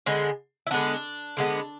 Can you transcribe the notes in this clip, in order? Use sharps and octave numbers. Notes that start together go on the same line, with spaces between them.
D3 G#3 B3
E4
D3 G#3 B3 D4
D3 G#3 B3